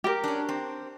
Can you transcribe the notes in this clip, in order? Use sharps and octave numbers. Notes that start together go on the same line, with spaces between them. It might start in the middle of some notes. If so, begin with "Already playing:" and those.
G4 A#4
C#4 D4
C4